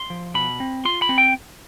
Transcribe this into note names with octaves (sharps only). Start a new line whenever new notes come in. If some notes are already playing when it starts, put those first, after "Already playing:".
Already playing: C6
F3
B2 B5
C4
F4 C6
B5
C4
G5